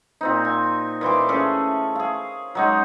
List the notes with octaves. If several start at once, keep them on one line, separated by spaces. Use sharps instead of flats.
A#2 C4 D#4
G#5
A#2 E3 C6 D6
A3 C#4 G#4 A4
G#4 F5
F#3 G#3 D#4